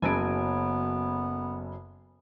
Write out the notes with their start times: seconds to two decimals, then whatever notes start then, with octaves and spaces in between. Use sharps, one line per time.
0.02 F#1 C#3 F#3 B3 A4 G#5 D7